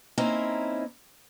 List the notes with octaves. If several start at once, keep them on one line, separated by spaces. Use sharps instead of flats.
A#3 C4 C#4 D#4 E4